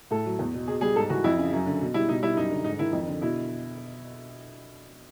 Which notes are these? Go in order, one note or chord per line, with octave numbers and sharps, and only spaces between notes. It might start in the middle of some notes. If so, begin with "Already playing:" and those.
A2 A4
F#3
E2
B2
B2 G#4
G3 G#4
G#2 A4
E3 F#4
F2 E4
C#3
F#2
D3
B2
G3 E4
B2 D#4
G3 E4
F#2 D#4
D3
G#2 D#4
D#3 E4
F2
D3
B2 E4